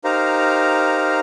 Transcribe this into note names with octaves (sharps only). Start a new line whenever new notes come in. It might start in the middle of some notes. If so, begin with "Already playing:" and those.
D#4 G4 A#4 C5 F5 A#5